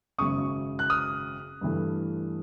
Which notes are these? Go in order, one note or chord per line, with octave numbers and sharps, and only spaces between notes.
G#1 F#2 C#3 C#6 D#6
F#6
D#6 F6
G2 E3 A3